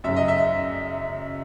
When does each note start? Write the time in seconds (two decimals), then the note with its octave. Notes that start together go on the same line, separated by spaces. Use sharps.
0.04 F#2 C#3 F#3 E5
0.16 D#5
0.28 E5